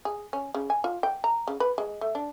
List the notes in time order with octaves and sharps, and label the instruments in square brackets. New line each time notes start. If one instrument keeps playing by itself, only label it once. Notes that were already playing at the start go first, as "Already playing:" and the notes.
[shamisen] G#4
C#4
C#3
G#5
F4
G5
A#5
C#3
B4
G#3
A3
D4